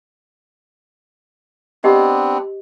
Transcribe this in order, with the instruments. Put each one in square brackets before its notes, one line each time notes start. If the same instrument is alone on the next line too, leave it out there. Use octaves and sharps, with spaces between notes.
[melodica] B3 C4 D4 [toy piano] G4 D#5